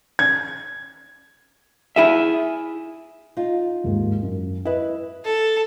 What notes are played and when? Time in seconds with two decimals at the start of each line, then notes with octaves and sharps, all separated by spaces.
0.19 G#6
1.96 E4 G#4 E5
3.37 D#4 F4
3.84 D#2 G#2
4.23 F#2
4.65 E4 B4 D#5
5.25 A4